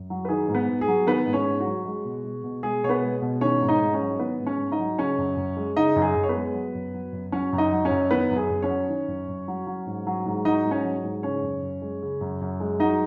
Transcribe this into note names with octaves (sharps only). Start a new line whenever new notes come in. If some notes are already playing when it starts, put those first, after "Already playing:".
Already playing: F#2
F#3
B4
D#3 G#4
G#2
B3 B4
G#2
G#4
F#3
D#3 B3 B4
G#2
C#4 C#5
G#2
F#4
F#3
G#3
B2
G#3
B2
G#3 G#4
B2 C#5
B3 B4
G#3
B2
D#3 C#4 C#5
G#2
D#4 D#5
G#2
C#4 C#5
F#3
D#3 B3 B4
G#2
C#4 C#5
G#2
D#4 D#5
F#3
C#3 C#4 C#5
F#2
F#2
G#3
C#3 D#4 D#5
F#2
G#4
F#2
C#5
B3 B4
G#3
F#3
F#2
F#3
F#2
F#3 C#4 C#5
F#2
D#4 D#5
F#3
C#4 C#5
F#2
D#3 B3 B4
F#2
G#4
F#2
C#4 C#5
F#3
D#3
F#2
F#2
F#3
F#3
G#2
F#3
G#2
F#3 D#4 D#5
G#2
C#4 C#5
F#3
G#2
C#3 C#4 C#5
F#2
F#2
G#3
C#3
F#2
F#2
G#3
F#3 D#4 D#5